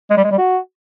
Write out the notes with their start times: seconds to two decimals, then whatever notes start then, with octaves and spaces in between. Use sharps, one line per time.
0.10 G#3
0.17 G3
0.24 G#3
0.31 G3
0.38 F#4